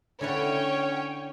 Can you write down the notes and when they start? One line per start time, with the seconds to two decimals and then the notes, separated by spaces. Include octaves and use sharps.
0.21 D3 C#4 E4 C#5 F#5 G5